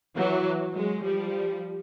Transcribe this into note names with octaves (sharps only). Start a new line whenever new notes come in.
E3 F#3
F#3 G#3
F3 G3